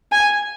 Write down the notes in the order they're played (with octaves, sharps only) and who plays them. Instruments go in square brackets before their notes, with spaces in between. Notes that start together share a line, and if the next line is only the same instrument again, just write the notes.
[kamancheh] G#5